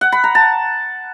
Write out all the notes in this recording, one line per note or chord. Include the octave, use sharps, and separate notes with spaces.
F#5
B5
A#5
A5